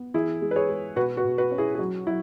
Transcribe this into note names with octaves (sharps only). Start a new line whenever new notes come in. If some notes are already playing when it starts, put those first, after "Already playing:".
Already playing: B3
E3 E4 G#4
G#3
B4
G#4 C#5
G#3
B2 F#4 B4
F#4 B4
B2
F#4 B4
C#4
E4 G#4
G#4
F#3 F#4
F#3 E4